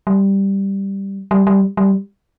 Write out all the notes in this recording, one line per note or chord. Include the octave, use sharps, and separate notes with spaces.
G3
G3
G3
G3